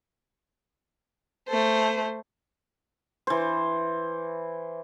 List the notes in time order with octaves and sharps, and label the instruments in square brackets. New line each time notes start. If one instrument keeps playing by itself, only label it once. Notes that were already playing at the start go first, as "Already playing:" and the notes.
[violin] A3 C5
[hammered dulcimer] E3 C5